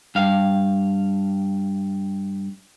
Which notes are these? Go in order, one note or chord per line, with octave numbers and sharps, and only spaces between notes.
G2 F5